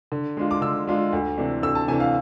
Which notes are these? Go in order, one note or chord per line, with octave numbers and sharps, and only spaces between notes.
D3
G#3 D4 F4
D6
D3 E6
G#3 D4 F4
D2
C3 E3 A3 D4
D2 E6
A5
C3 E3 A3 D4 G#5
F5